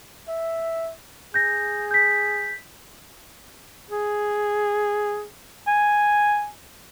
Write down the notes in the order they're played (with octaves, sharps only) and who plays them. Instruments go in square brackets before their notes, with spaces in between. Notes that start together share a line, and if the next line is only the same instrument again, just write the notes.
[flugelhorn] E5
[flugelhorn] G#4 [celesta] G6 A#6
[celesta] G6 B6
[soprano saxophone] G#4
[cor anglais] G#5